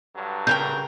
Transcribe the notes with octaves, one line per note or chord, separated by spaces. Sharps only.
G2 D3 F#3
C#3 A#4 G5 G6